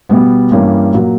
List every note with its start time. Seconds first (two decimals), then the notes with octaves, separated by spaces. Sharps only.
0.09 B2 G3 B3
0.51 G2 E3 G3 A#3 C#4
0.92 A#2 F#3 A#3